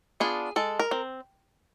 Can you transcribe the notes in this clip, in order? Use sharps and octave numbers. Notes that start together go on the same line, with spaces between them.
B3 D4 F4 G#4
G#3 A4
A#4
C4